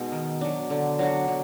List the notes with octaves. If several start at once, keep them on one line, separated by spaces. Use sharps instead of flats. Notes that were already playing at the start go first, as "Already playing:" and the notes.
Already playing: B2 G#3 D#4
D#3
F#3 D4
D3
F#3 D4 F#4
D3